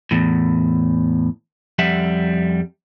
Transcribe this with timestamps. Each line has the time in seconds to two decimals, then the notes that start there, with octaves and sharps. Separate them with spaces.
0.11 E2 A2
1.79 F2 G3 E5 F#5